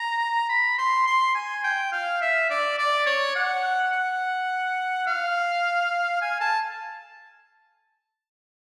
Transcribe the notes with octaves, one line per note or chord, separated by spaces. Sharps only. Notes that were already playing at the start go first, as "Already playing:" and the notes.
Already playing: A#5
B5
C6
C6
G#5
G5
F5
E5
D5
D5
C#5
F#5
F#5
F5
G#5
A5